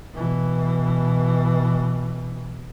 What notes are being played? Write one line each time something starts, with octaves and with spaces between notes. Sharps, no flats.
B2 E3